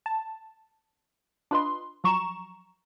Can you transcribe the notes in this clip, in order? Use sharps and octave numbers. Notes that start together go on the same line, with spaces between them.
A5
D4 F4 B4 D#5 C6
F3 F#3 A#5 C#6 E7